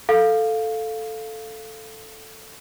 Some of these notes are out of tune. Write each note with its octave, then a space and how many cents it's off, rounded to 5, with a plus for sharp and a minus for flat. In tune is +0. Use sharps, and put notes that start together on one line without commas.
A4 +0 F5 +0